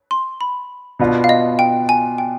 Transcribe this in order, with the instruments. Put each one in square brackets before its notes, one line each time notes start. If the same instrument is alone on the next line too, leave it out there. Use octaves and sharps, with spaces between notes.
[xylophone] C6
B5
[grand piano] B2 B3 D4 F4
[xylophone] F5
D#5
G5
G#5
G5